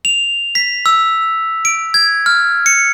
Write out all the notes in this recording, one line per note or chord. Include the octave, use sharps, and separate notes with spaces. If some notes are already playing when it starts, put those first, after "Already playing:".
F7
B6
E6
D7
G#6
F6
C#7